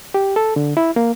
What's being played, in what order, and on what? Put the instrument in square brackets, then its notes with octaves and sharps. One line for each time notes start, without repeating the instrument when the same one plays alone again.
[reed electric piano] G4
A4
D3
E4
A#3